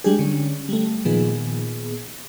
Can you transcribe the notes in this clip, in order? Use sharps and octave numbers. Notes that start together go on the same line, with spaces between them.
G3 G#3 D4 G4 G#4
D3 C#4
G3 A3
A#2 D#3 F3 B3 G#4